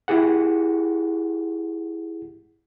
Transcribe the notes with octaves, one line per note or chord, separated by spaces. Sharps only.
E4 G4 G#4 F#5